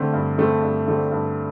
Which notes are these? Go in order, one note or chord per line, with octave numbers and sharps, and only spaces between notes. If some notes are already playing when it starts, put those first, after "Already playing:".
Already playing: D3 A3 C4
G2
D3 A3 C4
G2
D3 A3 C4
G2